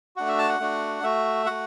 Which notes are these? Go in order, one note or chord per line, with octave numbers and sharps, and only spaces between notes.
A3 D4 F#4 F#5
E5
A5
F#5
A3 D4 F#4
A3 F#4 E5
A3 F#4 F#5